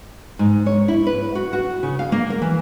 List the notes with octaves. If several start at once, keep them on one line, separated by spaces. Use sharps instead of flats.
G#2
C#5
E4
B4
F#4
F#4
C#3
F5
A#3
A#4
E3